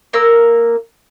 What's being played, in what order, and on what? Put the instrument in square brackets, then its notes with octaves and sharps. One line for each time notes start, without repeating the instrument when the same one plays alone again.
[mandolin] A#3 A#4 E6